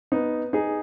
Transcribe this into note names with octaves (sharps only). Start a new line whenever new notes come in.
B3 D#4
D#4 G#4